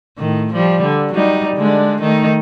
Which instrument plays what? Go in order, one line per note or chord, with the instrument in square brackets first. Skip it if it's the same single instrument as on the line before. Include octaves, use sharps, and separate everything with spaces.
[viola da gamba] A2 D#3
F3 G3
D3
F#3 G3 D#4
D3 G#3 D4
D#3 A3 D#4